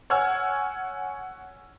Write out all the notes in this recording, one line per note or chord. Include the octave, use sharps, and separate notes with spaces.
C#5 F#5 G#5 E6 F6 G#6